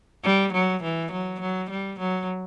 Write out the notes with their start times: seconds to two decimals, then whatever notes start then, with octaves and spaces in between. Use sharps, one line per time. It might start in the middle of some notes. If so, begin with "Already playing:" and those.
0.24 G3
0.53 F#3
0.83 E3
1.12 F#3
1.41 F#3
1.70 G3
1.99 F#3